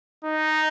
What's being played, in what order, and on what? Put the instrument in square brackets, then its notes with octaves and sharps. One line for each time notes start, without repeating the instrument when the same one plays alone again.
[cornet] D#4